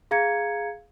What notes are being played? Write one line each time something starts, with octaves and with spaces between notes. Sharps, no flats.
G#4 F5 A#5 G#6 C#7